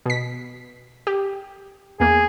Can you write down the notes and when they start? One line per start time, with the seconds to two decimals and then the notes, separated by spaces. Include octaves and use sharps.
0.06 B2 B6
1.07 G4
2.00 E2 A#3 G#4